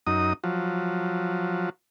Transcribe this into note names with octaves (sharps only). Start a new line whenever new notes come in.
F#2 D#4 D#6
F3 F#3